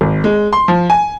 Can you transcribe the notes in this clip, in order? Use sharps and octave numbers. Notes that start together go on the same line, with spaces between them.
G#1
G#3
C6
F3
G#5